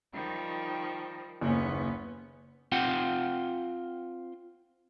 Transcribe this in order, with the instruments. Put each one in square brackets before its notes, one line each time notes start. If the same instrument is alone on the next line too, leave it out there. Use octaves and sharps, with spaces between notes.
[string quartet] D#3 F3 G3
[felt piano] F#1 D#2 [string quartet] B3 C#4
[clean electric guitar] C4 F4 F#5 G5